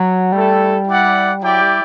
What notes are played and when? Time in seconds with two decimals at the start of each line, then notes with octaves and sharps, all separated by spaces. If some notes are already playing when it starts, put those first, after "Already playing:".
Already playing: F#3
0.32 G3 A3 E4 A4
0.88 E4 G4 D5 F#5
1.42 F#3 E4 G4 D5 G5
1.62 G3